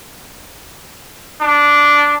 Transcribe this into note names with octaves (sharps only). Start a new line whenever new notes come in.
D4